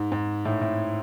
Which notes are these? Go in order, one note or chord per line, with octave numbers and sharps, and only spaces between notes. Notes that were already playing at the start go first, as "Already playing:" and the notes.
Already playing: G#2
G#2
A2
A2